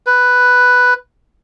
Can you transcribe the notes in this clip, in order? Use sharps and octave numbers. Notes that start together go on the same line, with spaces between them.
B4